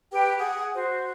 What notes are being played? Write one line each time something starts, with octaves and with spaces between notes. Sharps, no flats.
G4 B4 G5
G#4 F#5
F#4 C5